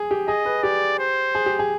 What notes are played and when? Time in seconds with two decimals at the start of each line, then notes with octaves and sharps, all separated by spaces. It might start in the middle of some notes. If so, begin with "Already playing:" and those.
Already playing: G#4
0.11 G4
0.28 G#4 D#5
0.45 B4
0.63 G4 D5
0.99 C5
1.35 G#4
1.46 G4
1.59 G#4